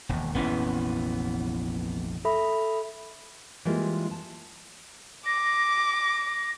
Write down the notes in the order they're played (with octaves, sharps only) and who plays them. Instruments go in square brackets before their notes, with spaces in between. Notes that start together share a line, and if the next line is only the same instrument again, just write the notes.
[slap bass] E1 D#2
[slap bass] F1 A#1 C#4 [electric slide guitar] E3 B3
[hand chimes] A4 E5 B5
[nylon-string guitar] E3 G3 G#3 A#3 F4 D#5
A5
[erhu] D6 [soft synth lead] A#6